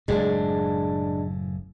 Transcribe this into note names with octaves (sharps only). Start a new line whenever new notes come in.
F#1 A2 G#3 D4